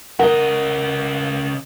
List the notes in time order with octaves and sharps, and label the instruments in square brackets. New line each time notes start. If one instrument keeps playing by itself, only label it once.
[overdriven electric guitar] C#3 D#5 [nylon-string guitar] A#4 [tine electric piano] F#5